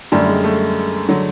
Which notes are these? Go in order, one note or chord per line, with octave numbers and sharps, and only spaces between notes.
F#2 D3 G3 A3
G#3
A3
D3 F#3